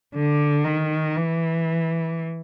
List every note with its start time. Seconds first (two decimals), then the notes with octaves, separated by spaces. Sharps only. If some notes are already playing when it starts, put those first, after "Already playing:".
0.15 D3
0.64 D#3
1.16 E3